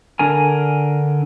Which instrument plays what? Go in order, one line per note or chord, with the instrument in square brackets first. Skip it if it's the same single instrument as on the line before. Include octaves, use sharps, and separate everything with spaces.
[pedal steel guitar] D3 D4 A#4 G#5